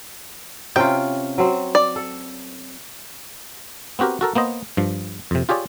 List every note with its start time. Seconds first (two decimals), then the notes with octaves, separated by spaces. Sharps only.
0.76 C3 C#4 F4 G5
1.38 F#3 C4
1.75 D5
1.96 A4
3.99 B3 C4 F#4 G4 A#4
4.21 F#4 A4 A#4
4.35 A#3 B3 C5 D#5
4.77 G2 F3
5.31 F2 C3
5.49 F4 G4 G#4 C#5 D5